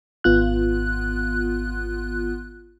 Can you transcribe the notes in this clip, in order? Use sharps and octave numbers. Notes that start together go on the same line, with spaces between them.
G#1 B3 F4 F#6